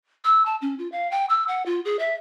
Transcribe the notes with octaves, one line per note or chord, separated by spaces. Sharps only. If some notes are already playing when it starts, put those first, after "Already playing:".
E6
A5
C#4
F4
F5
G5
E6
F#5
F4
G#4
E5